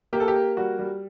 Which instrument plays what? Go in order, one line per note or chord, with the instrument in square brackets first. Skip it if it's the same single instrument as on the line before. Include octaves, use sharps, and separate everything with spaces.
[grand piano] A#3 G4
A4
G4
A#3
G3 F#4
G3